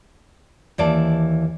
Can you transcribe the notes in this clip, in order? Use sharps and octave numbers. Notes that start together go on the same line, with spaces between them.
D#2 E3 D5 A5